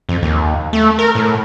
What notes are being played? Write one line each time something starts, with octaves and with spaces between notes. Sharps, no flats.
F2
D#2
A3
A#4
A2